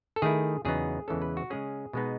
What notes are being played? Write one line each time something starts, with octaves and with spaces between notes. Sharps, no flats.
A4
D#3 A3 E4 G#4
E2 C#3 F#3 B3 D#4 G#4
E2 C#3 E3 G#3 C#4 A4
B4
F#4
C#3 G#3 C#4 G#4
B2 G#3 B3 D#4